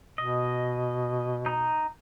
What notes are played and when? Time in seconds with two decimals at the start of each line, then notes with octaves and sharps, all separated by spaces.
0.18 B2 D#5
1.46 D#4 A#5